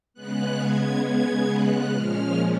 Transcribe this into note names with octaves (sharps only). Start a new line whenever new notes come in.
C#3 G#3 B3 F#6
G#6
G#6
F#6
A#2 F3 G#3 C#4 F6